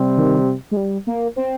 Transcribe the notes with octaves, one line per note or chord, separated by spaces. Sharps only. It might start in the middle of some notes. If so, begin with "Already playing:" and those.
Already playing: C3 G3 C4
D#3
G#3
G3
A#3
C4